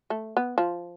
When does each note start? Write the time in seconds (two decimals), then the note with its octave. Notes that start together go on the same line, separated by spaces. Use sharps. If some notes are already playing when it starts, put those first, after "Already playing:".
0.10 A3
0.37 B3
0.58 F3